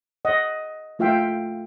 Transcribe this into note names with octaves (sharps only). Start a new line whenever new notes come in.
D#5 F#5
A3 F4 E5 F5 G5